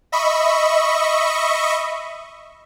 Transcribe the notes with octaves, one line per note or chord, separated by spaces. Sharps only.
D#5 E5 B5 C#6